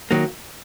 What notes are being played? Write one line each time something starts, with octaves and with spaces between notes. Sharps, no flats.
D#3 F#3 A#3